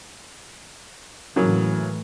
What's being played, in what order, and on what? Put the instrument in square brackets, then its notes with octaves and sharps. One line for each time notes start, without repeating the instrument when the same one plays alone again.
[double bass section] A2 E3 [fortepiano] C#3 F#3 A#3